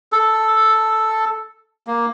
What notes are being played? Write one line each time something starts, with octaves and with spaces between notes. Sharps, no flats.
A4
A#3